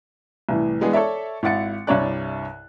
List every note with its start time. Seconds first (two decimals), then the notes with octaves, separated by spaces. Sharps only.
0.49 C2 A2 E3
0.81 E3 G#3 B3 D4 G#4
0.93 A4 C#5 D5 E5
1.43 G#1 E4 F#5 A6 C#7
1.87 C2 G2 E4 C#5 D5 F#6